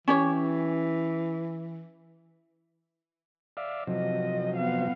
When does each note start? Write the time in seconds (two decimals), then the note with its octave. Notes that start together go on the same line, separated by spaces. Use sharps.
0.08 E3 C#4 G4 C#5
3.57 D5 E5 F5
3.87 C3 F3 F#3 D#5
4.57 B3 F5